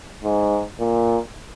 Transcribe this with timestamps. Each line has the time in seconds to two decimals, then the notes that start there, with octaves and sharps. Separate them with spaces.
0.24 G#2
0.80 A#2